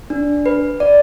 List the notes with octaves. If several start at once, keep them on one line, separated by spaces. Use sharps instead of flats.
D4
B4
D5